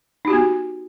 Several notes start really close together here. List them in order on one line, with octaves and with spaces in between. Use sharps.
D#4 G4 F#4 B3